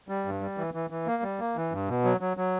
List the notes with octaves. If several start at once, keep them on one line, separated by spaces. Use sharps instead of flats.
G3
G2
G3
E3
E3
E3
A#3
G3
A#3
E3
G2
B2
F#3
F#3
F#3